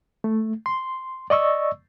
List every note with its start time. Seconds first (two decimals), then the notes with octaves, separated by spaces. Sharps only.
0.24 A3
0.66 C6
1.30 D5 D#5 C#6 E6